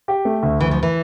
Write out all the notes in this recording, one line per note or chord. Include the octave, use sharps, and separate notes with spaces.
G4
A3
D2
D2 E3
F3
E3